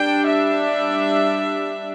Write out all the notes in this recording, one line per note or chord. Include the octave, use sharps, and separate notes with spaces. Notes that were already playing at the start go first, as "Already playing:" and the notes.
Already playing: G3 D4 G5
E5